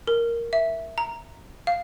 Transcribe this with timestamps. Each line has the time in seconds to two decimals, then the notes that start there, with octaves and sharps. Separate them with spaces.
0.07 A#4
0.53 E5
0.98 A#5
1.67 F5